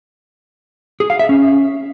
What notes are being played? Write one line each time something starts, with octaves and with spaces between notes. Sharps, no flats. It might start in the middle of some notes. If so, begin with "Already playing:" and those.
G#4
F5
E5
C#4